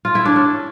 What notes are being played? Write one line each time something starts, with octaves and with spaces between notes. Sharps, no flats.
F4
E4
D4
C#4